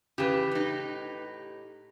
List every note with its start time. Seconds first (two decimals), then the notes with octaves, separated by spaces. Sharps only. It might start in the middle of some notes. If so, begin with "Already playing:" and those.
0.18 C#3 E3 G4 B4
0.51 A2 D#4